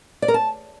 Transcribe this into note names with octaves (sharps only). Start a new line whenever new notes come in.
D5
A#4
A5